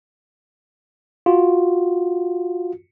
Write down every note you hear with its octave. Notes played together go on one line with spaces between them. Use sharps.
F4 F#4